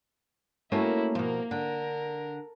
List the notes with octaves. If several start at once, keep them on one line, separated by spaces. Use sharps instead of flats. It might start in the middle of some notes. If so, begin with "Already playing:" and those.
A3 A#3 C#4 E4 F#4
B2 F3 A#3 A#4
D3 A#4